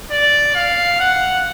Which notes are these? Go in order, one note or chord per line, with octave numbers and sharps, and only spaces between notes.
D5
F5
F#5